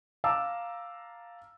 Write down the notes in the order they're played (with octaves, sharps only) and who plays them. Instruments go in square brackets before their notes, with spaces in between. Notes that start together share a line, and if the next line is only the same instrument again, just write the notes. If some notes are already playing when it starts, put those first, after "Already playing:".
[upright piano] F5 A5 A#5 D6 E6